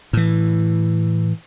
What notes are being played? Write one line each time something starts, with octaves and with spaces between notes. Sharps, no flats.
A2 E3